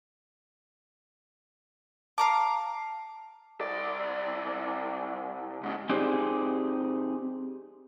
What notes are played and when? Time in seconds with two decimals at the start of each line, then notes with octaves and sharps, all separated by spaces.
2.18 F5 A5 A#5 D6
3.61 C2 D5
5.63 G#2 C#3
5.89 C4 D#4 G4 G#4 C5 D5